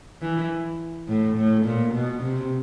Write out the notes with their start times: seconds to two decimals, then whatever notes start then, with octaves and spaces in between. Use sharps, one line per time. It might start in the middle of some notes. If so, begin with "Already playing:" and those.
0.21 E3
1.08 A2
1.37 A2
1.65 A#2
1.94 B2
2.22 C3